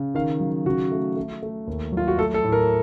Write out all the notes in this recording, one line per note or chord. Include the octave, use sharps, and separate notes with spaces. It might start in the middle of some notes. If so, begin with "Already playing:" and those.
Already playing: C#3
D#3 F5
F#3
C#3 F#4
A3
A3
A3
D#2
F#3
F4
F#4
A3 A4
A4
A2
A#4